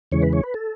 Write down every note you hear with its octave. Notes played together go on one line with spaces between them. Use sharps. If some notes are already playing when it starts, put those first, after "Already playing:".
E2 C#3 E3 G#3 C#5
B4
C#5
B4
A4